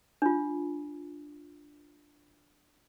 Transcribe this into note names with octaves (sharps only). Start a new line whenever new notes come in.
D4 F4